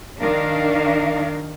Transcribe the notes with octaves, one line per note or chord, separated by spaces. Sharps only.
D#3 D4 A#4 F5